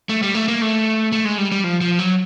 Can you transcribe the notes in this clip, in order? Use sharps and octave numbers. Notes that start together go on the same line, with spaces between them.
A3
G3
A3
A#3
A3
A3
G#3
G3
G3
F3
F3
F#3